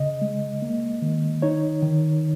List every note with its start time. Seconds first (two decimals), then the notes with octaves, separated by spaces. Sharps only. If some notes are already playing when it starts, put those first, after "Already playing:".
Already playing: C#3 D#5
0.22 G#3
0.62 A#3
1.02 D#3
1.42 D#4 C#5
1.82 D#3